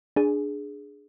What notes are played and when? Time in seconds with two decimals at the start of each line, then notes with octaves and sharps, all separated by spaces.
0.16 D4 G#4